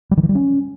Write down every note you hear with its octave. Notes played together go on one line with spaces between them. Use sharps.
G3
D#3
E3
G3
C#4